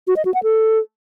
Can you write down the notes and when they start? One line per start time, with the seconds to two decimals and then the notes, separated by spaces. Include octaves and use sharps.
0.07 F#4
0.16 D#5
0.25 F#4
0.34 F#5
0.43 A4